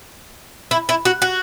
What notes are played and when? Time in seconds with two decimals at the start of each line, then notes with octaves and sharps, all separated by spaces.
0.71 E4
0.89 E4
1.05 F#4
1.22 F#4